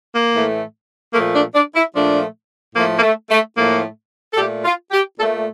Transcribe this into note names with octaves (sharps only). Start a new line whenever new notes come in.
A#3
A2 E3 A3
A#2 F3 A3 A#3
D4
D4
E4
A#2 F3 A3 D4
A2 F3 A3 A#3
A#3
A3
A3
A2 F3 A3 A#3
A4
A#2 A3 G4
F4
G4
A#2 A3 A4